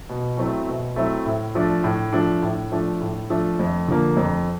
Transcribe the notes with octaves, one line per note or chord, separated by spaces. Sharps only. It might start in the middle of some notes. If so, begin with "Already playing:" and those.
B2
F#3 A3 C4 E4
B2
F#3 A3 C4 E4
A2
F3 A3 D4
A2
F3 A3 D4
A2
F3 A3 D4
A2
F3 A3 D4
F2
D3 F3 A#3
F2